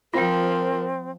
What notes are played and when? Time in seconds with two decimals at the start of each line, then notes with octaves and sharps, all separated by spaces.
0.14 F3 C4 F4 A#4 G5